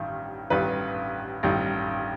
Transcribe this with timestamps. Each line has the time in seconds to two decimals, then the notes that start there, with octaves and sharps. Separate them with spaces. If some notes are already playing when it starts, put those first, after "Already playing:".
Already playing: A1 G2 D#3
0.50 A1 G2 D#3 B4
1.43 A1 G2 D#3